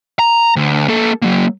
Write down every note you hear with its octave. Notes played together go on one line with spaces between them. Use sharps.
A#5
D2
A#3 A4
F#3 A#3